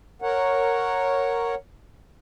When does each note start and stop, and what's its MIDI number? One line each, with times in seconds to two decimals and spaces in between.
0.22 1.55 70
0.22 1.55 73
0.22 1.55 78